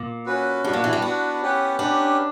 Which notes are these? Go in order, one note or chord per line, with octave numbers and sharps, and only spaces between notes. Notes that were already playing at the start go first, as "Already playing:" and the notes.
Already playing: A#2
C#4 F#4 B4
G2 D4 F#4 B4
A#2
E3
G3
B3 D4 F#4 B4
C#4 G4 B4 F#5
C#4 D4 G4 B4 F#5